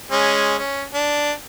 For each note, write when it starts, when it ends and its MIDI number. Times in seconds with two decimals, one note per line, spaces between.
0.11 0.56 56
0.11 0.56 61
0.58 0.83 61
0.94 1.32 62